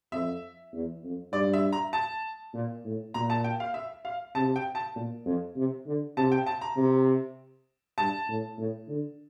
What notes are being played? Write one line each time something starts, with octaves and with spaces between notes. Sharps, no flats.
F2 E5
E2
F2
G2 D5
E5
A#5
A5
A#2
A2
A#2 A#5
A5
G5
F5
E5
F5
C3 A5
G5
A5
A#2
F2
C3
D3
C3 A5
G5
A5
A#5
C3
G2 A5
A2
A2
D3